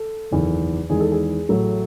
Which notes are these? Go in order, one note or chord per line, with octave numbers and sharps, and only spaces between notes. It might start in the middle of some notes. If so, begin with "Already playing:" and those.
Already playing: A4
F#1 E2 D#3
E2 D#3 G#3 G#4
A4
G#4
A1 A2 F#3 A3